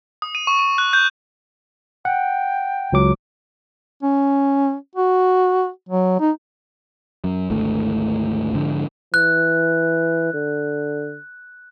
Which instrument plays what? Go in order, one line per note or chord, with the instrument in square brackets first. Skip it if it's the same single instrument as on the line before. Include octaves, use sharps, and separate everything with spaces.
[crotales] D#6
D#7
C#6
D#7
F#6
G6
[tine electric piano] F#5 [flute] G5
[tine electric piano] C#2 F#3 D6
[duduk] C#4
F#4
F#3
D#4
[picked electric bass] F#2
G#1 D2 A3
G#2 D3 F3
[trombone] E3 [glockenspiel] F#6
[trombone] D3